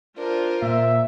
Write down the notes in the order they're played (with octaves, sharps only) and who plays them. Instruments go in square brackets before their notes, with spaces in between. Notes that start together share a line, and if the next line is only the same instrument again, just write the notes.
[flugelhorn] D4 [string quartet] F4 A#4 C5
[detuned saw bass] A#2 [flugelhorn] E5